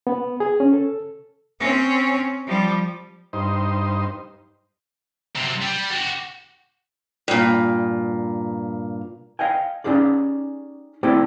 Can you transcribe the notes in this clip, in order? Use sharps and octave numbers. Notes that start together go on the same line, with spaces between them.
B3
G#4
C#4
A4
C4 C#4
F3 G3
G2 D#4 C5
F#2 C3
G3
F#4 G4
G2 A#2
D#5 F5 G5 G#5
C#4 D#4 G4 G#4 D5
A3 C4 E4 G4 D5 G5